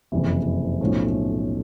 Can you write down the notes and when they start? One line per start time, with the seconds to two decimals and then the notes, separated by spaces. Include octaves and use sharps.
0.12 F#1 F2 C3 E3
0.81 B1 A2 F3 A3 C#4